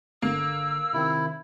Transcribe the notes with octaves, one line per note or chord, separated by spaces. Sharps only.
G1 D3 A#3 E6
C3 D#3 C4 E4